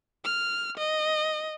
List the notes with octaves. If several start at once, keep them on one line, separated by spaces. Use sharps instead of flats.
F6
D#5